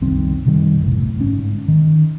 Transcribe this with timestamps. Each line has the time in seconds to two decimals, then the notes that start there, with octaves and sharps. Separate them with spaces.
0.01 F#1 C2 D#3 C4
0.46 F#2 C3 D#3 G3
0.80 F#1 B1 A2
1.17 G1 G#2 C#4
1.68 D#3